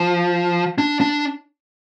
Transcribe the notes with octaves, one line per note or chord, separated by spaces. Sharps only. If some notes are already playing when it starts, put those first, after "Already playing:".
Already playing: F3
D4
D4